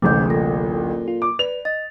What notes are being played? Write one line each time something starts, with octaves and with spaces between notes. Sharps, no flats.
D1 A1 G#2 C3 A3 D6 G6
A#2 A4 A#6
F4
D6
B4 D5 F7
D#5 A6